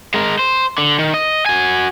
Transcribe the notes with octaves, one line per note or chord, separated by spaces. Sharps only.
G#3 A#4
C5
D3
D#3
D#5
F#4 G#5